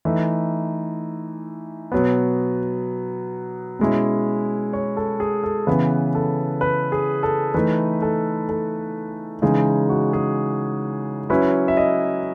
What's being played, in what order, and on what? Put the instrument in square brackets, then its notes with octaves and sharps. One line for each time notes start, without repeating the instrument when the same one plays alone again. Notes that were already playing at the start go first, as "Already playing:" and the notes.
[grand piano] E3 A3 D#4 E5
B2 F#3 B3
B2 G#3 C#4 E4
C#5
A4
G#4
A4
C#3 E3 B3 B4
A4
B4
G#4
A4
E3 A3 D#4 B4
A4
A4
C#3 E3 G#3 D#4 G#4
F#4
G#4
F#3 C#4 E4 B4
E5
D#5